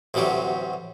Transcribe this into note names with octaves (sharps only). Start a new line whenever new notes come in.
A1 D2 C3 F#3 G3